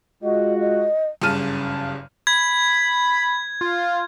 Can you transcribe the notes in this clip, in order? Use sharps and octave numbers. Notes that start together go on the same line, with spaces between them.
G#3 F4 F#4 D#5
D#5
F#1 G2 C#3 A5 F6 D#7
B5 G#6
F4